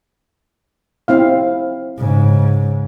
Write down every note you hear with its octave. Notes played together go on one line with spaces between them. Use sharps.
C4 E4 F5
G#2 C#3